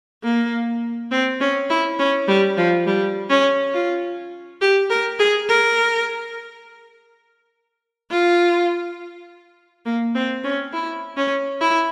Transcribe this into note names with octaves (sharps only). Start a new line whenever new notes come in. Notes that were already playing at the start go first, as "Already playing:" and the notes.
A#3
C4
C#4
E4
C#4
G3
F3
G3
C#4
F4
G4
A#4
G#4
A#4
F4
A#3
C4
C#4
E4
C#4
E4